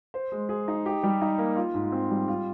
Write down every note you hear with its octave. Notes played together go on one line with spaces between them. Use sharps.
C5
G#3
G#4
D#4
G4
G3
D#4
A#3
F4
G#2
C4
G3
F4